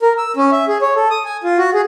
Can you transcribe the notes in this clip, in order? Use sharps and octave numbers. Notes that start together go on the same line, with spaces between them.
A#4
E6
C#4
E5
G#4
C#5
A4
D#6
G#5
F4
F#4
G#4